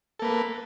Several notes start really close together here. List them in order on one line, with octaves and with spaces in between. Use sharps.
A4 A#3 B4